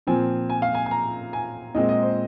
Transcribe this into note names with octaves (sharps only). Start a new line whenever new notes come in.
A#2 F3 C4 G#5
G#5
F5
G#5
G#5
A#5
G#5
A#2 G#3 C4 D#5
D#5
C5